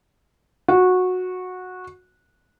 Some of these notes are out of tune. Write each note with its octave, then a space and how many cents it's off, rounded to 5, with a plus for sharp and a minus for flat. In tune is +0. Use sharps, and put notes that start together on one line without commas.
F#4 -15